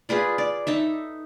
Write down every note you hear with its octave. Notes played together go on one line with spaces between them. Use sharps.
F4 G#4 B4 D5
D5
D#4 A4 E5